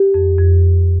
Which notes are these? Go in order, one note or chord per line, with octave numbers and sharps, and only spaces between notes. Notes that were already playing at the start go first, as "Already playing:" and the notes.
Already playing: G4
F2
F2